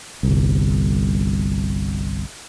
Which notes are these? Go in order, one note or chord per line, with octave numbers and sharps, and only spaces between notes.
G1 C2